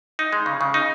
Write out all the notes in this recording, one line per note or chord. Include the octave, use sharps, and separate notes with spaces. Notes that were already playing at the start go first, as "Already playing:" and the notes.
D#4
G#3
C#3
C#3
D#4